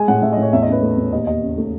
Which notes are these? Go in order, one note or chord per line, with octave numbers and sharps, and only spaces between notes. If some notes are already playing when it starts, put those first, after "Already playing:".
Already playing: G#3 G#5
A2 F#5
A2 E5
D#5
A2
C#5
E2 E5
D#5
C#4 B4
A3
E2
D#2 D#5
D#2 D#5
C#3
A3